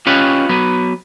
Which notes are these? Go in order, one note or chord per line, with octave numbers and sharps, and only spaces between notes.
C#4 F4 G4 B4 C#5 D#5
F#3 B3 B4